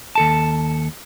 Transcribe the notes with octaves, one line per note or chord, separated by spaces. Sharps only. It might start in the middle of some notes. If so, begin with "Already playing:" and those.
D#2 A4 A5